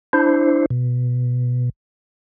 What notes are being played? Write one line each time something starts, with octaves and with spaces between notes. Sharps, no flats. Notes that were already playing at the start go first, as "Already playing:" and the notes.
D4 E4 C5
B2